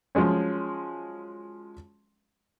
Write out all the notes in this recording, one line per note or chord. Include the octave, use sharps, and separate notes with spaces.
F3 F#3 G#3 C#4